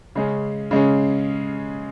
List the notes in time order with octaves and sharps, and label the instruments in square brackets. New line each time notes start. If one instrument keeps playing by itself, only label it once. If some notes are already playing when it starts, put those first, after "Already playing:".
[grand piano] C#3 G#3 C#4
C#3 G#3 C#4